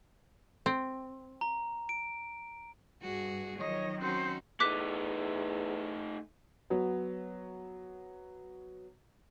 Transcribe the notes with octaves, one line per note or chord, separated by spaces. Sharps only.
C4
A#5
D7
G2 F#4 G#4
D#3 F3 F#3 C#5 D#5
C4 C#4 D#4 F#4 C5
E2 A3 D#4 D6 F#6 B6
F#3 B3